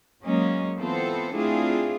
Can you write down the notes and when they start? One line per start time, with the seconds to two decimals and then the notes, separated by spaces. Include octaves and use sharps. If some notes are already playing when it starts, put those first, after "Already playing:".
0.24 F#3 G#3 A#3 C#4 D#5
0.77 E3 B3 C4 F4 A4 C5
1.34 A3 C4 D4 E4 F4 G#4